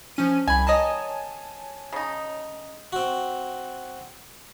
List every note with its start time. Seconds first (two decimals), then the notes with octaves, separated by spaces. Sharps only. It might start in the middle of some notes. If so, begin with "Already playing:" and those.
0.16 F3 C#4 D#7
0.48 C2 G#5 B5
0.67 D#3 C#5 D#5 G#5 A5
1.93 C#3 D#4
2.92 C4 F#4